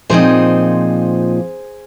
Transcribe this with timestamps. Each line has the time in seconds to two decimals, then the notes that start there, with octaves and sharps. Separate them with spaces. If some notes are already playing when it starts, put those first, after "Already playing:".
0.10 A#2 F3 C4 D#4 G#4 C5